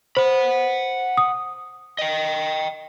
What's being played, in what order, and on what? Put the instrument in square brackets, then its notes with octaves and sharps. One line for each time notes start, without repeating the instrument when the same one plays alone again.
[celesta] C5 [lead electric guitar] F#5 B5
[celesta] D#6
[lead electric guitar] D#5 G5